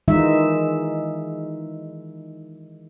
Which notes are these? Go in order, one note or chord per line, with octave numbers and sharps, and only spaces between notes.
D#3 E3 G#3 D#4 F4 E5